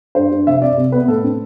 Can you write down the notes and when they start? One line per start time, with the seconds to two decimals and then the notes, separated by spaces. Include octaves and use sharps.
0.15 G2 C5
0.32 G2
0.47 F1 E5
0.62 C3 D5
0.78 C2
0.92 B3 B4
1.08 A2 A4
1.24 C4